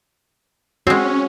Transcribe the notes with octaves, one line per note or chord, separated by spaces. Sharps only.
G#3 C4 C#4 F#4